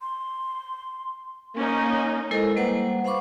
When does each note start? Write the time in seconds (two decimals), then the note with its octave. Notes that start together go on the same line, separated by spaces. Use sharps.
0.01 C6
1.55 A#3 C#4 D#4
2.31 G#3 E4 A4 A#4 C5 D#5
2.56 G3 A#3 B4 C5 F#5
3.04 C5 F5 F#5 B5 C#6 D6